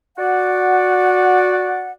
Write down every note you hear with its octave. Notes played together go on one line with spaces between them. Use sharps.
F#4 D5 F#5